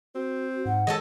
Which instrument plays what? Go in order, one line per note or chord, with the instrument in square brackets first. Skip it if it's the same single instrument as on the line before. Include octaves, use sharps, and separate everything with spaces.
[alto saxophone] C4 [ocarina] F#4
[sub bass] G#2 [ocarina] F#5
[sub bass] D#3 [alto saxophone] G#3 [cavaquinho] A4 C#5 D#5